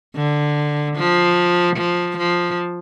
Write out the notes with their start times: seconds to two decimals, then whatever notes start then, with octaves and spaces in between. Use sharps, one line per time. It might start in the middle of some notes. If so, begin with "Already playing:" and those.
0.15 D3
0.96 F3
1.77 F3
2.18 F3